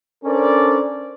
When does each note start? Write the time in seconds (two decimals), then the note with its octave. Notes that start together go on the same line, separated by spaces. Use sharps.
0.25 C#4 D4 A4 A#4 C5 D5